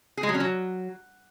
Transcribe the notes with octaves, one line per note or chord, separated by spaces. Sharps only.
G#4
G#3
F#3
C#4
F#3